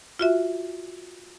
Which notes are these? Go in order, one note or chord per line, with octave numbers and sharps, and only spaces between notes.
F4 F#4 E5